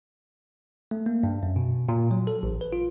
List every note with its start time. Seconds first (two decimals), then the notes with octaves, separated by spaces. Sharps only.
0.91 A3
1.06 A#3
1.23 G2
1.43 F#2
1.56 B2
1.89 A#2
2.11 F#3
2.27 A4
2.43 A1
2.61 B4
2.73 F4